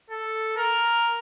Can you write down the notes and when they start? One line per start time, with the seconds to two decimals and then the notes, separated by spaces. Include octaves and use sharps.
0.10 A4
0.57 A#4